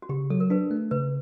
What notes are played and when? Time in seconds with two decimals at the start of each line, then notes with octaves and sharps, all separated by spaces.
0.02 F#4
0.09 C#3 G4
0.30 F#3 A4
0.40 A#4
0.50 D4 B4
0.71 A3
0.91 C#3 B4